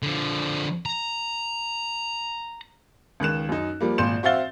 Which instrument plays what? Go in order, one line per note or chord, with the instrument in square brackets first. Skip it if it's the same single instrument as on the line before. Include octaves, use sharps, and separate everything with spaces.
[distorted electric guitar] D3 F3
A#5
[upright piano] C#2 D#3 F#6 E7
F#2 D#4
F3 G3 A#3
G#1 A#2 C6 G6 E7
C4 F#4 E5 F5 A6 G7